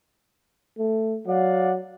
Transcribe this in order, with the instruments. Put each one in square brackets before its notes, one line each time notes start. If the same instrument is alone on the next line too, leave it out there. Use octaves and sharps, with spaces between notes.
[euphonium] A3
[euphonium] F#3 [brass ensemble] D5 F5 F#5